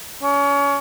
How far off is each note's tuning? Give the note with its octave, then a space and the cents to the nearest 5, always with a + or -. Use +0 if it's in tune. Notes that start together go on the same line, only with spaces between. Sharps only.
C#4 +30